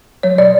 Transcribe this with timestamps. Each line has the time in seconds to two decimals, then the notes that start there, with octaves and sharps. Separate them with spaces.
0.23 F#3 C#5
0.38 B2 D5